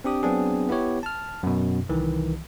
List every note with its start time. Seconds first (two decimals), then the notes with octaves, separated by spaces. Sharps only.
0.04 C4 D4 G4 D#6
0.23 F#3 B3 C4 D4 G#4
0.69 B3 E4 G4 C#5
1.03 A5 F6
1.43 F#2 B2
1.89 C2 D#3 E3